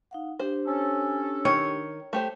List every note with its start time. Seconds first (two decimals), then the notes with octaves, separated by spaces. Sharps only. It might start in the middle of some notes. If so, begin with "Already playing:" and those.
0.11 D#4 F5 F#5
0.40 D4 G4 C5
0.66 C#4 A4
1.45 D#3 C#5
2.13 A3 G4 C5